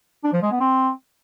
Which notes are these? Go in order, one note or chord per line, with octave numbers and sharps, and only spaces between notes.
D4
F3
G#3
B3
C4